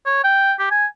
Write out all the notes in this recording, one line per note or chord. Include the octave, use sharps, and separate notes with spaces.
C#5
G5
G4
G#5